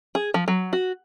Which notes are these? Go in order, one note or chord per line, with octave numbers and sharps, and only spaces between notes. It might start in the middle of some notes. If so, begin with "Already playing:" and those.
G#4
F3
F#3
F#4